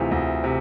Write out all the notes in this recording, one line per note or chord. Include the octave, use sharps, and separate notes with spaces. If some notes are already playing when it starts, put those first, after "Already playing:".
Already playing: D2 C3 E3 F4 G#4
D2
C3